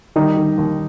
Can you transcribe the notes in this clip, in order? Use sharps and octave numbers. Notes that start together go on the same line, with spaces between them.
D#3 G3 D#4
D#3
D#2